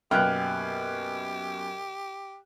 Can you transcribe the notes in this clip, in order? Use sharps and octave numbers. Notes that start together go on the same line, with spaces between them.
F#2 B2 A#3 G4 G5 F6 F#6